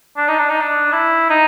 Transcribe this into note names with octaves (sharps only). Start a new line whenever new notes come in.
D4
D#4
D4
D#4
D4
E4
D#4